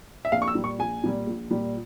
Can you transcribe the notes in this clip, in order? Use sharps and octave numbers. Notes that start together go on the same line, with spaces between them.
E5
A#1 F5
C#6
E6
A#2 G3
C#6
A#1 G#5
A#2 G3
A#1
A#2 G3